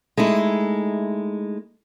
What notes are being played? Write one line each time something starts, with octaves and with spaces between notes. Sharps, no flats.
G#3 A3 D#4 E4